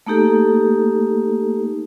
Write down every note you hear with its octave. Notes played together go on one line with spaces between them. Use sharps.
A3 A#3 D#4 G4 A4